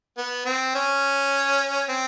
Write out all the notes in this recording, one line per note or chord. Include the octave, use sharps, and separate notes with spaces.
B3
C4
C#4
C4